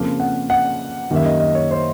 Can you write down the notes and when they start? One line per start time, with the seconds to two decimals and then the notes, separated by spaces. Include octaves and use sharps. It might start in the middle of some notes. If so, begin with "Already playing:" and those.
Already playing: F2 C#3 F3 A#3 F5
0.20 F#5
0.50 F#5
1.11 F#2 D#3 G3 A#3 E5
1.25 D#5
1.40 D#5
1.55 C#5
1.71 C5